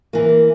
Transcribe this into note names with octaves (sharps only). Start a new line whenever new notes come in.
E3 A#3